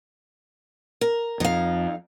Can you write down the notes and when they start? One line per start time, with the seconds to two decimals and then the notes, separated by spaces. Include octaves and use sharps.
1.01 A#4
1.40 F2 D#4 F5